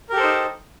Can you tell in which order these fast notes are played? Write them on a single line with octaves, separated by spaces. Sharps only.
A#4 G4 A4 C5 D#4